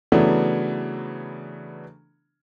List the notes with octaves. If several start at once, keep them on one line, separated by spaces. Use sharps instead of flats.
C#3 E3 F#3 A3 B3 D4